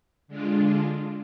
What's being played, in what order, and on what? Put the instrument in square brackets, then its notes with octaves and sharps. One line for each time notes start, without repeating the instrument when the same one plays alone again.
[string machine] D3 G#3 D4 F4